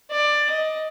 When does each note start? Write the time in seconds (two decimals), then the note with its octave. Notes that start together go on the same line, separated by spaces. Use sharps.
0.11 D5
0.50 D#5